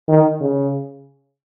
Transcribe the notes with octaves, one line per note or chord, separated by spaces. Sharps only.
D#3
C#3